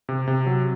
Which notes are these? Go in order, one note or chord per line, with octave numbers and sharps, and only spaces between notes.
C3
C3
F#3